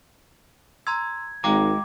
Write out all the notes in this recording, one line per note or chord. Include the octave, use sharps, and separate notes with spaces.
A#5 C6 E6 G#6
G#1 G#3 F5 G5 A#5 D6